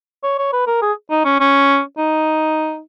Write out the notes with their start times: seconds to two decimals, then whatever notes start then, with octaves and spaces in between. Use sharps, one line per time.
0.23 C#5
0.38 C#5
0.53 B4
0.67 A#4
0.82 G#4
1.11 D#4
1.25 C#4
1.40 C#4
1.98 D#4